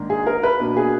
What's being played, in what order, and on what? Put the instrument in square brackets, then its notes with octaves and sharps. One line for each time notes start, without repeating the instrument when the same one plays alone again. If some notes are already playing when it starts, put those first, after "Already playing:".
Already playing: [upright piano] G#2 D#3 A#3 D4
G#4
A#4
B4
B2 A#3 D4
G#4